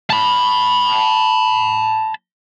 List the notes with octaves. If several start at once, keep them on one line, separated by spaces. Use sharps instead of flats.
A5 B5